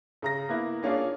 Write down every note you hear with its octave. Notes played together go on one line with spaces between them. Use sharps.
C#3 A#5 A#6
A#3 B3 E4
A#3 C#4 D4 F4 G#4